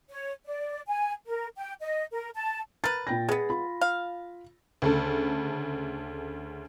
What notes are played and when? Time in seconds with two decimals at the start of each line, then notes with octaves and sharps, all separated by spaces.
0.10 C#5
0.45 D5
0.87 G#5
1.27 A#4
1.57 G5
1.81 D#5
2.12 A#4
2.35 A5
2.84 A#4 B4 A6
3.07 A#2 G5 A#6
3.29 G#3 B3 G#4 B4
3.50 F4 B5
3.81 F5
4.82 D2 C#3 A4